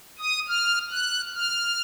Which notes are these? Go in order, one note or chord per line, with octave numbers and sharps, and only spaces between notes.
D#6
F6
F#6
F6